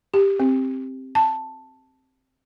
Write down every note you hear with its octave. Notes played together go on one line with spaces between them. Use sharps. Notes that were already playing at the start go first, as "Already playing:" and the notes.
G4
C4
A5